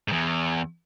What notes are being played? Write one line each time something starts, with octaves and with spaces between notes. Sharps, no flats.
E2 G#2